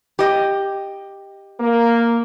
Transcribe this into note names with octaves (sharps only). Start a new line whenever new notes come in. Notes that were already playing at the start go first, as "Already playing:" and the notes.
G4 D#5
A#3